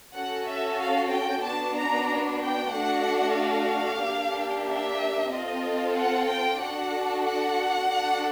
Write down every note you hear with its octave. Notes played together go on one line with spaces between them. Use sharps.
C#4 F#4 A4 F#5
E5
F5
G5
B3 D4 F#4 A5
A#5
G5
A3 D4 F#4 A4 F#5
F5
A#3 D4 G4
E5
C4 F4 A4 D#5
F#5
G5
D4 F#4 A4 F#5
F#5
D4 F#4 A4